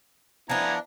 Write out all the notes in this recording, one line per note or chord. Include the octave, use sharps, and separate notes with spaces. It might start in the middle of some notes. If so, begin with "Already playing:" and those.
F3 B3 D4 E4 G#5 A#5